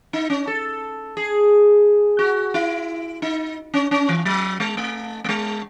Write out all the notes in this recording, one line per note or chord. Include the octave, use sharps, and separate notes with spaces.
D#4
C#4
A4
G#4
F#4
E4
D#4
C#4
C#4
E3
F#3
G#3
A3
A3
G#3